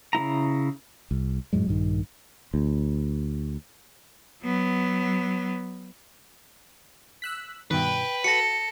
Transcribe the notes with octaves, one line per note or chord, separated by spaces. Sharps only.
C#3 A#3 E4 A#5
C2
F#2 A2 F#3 G#3
A#1 G2 D#3
D2
F#3 B3
E6 F#6 B6
G2 B2 D#3 B4 G5
F#4 A4 A#6 C#7